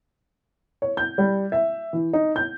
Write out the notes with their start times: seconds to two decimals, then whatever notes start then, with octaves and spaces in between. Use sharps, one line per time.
0.82 C#5
0.97 G6
1.18 G3
1.52 E5
1.93 E3
2.13 D#4
2.36 G6